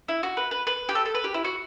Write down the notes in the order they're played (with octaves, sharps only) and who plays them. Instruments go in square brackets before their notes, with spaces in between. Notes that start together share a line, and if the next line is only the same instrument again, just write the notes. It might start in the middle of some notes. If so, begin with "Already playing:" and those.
[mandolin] E4
F#4
B4
B4
B4
G4
A4
A4
B4
G4
E4
F#4